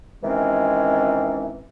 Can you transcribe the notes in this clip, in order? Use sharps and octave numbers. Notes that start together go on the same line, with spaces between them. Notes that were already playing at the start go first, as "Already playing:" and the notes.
C3 D#3 E3 G#3 C4 C#4